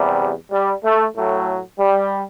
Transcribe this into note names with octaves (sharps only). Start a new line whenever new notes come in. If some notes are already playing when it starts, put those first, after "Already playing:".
Already playing: E2 C3 G3
G3
A3
A2 F#3 A3
G3